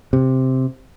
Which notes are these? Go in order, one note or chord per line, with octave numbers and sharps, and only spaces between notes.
C3